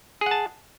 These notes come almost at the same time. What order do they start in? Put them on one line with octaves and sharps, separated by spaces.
G#4 F#5 A5